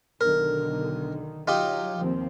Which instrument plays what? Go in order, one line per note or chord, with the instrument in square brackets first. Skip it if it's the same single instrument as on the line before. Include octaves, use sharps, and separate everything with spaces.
[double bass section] B1 D3 D#3 [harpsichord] A#4
[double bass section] F#3 [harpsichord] D#4 F4 G4
[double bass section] D#2 F3 C4